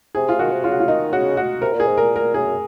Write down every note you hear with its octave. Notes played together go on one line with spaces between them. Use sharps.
C3 G#4
F4
D#3 F#4
C3
C#3 F4
F#4
F4
D#3 D#4
C#3 F#4
F#4
C3 A#4
A#2
G#4
G#2
A#2 A#4
A#4
F#2 G#4